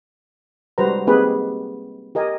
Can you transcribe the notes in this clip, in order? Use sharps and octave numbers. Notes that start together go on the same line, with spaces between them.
G3 G#3 F#4 B4 C5 A#5
A#3 C4 D#4 G4 G#4 B4
G4 A#4 D#5 G#5